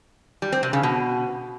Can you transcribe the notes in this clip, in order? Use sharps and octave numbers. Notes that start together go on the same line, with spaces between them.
G3
C4
C3
C#3
B2